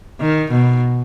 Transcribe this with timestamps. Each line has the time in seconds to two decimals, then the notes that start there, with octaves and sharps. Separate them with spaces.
0.20 D#3
0.51 B2